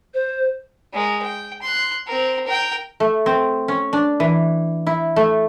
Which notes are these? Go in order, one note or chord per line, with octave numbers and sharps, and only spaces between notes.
C5
G#3 A#4
G5
C6 F#6
C4 A#4
A#4 G5
A3
C4
C#4
D4
E3
E4
A3